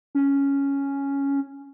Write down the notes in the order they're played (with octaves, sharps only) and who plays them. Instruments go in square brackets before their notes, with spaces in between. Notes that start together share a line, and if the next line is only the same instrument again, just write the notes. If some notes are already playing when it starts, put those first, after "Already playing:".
[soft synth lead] C#4